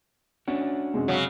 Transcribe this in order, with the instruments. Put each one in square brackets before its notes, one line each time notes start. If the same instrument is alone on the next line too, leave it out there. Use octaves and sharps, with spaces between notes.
[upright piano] C#4 [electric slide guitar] D4 F#4
[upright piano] F#2 C3 G#3
[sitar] C#3 F#3